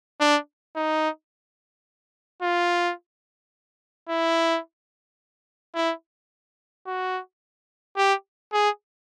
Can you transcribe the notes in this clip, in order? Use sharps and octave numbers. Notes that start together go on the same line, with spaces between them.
D4
D#4
F4
E4
E4
F#4
G4
G#4